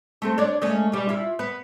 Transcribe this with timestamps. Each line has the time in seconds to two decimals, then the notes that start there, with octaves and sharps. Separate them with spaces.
0.22 A3 C4 A4
0.38 D4 C#5 D5
0.62 G#3 A3 C#4
0.92 B2 G3
1.09 E4 F4
1.39 B3 B4